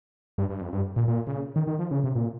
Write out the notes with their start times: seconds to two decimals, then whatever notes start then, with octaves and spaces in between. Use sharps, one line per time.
0.38 G2
0.50 G2
0.61 F2
0.73 G2
0.96 A#2
1.08 A#2
1.27 C#3
1.56 D#3
1.67 D#3
1.79 F3
1.91 C#3
2.04 C3
2.15 A#2